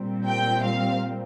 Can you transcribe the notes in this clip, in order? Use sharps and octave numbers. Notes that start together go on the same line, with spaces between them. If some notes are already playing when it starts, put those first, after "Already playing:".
Already playing: A#2 G3 C4
G5
F5